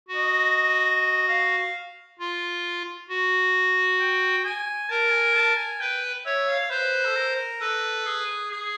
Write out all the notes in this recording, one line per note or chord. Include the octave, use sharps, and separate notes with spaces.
F#4
D#5
F5
F4
F#4
G5
G#5
A#4 A5
G#5
A5
G#5
B4 G5
C#5 E5
F5
B4 C5
A4
A#4
A4 B4
G#4
G#4